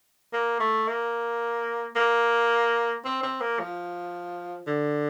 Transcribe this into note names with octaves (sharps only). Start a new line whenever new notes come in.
A#3
A3
A#3
A#3
C4
C4
A#3
F3
D3